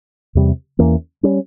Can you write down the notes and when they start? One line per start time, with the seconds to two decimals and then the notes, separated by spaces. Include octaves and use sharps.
0.35 E2 C3 G3
0.79 E2 E3 A#3 C#4
1.23 G3 C#4